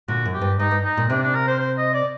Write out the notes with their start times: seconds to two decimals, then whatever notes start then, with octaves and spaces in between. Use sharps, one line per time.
0.08 A#2 D3 F#4
0.25 F#2
0.34 G4
0.41 G2
0.59 G2 D#4
0.71 G2
0.84 D#4
0.97 A#2
1.09 C3 D4
1.23 D4
1.35 A#4
1.47 C5
1.60 C5
1.78 D#5
1.94 D5